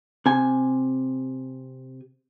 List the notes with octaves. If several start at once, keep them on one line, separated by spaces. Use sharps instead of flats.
C3 G#5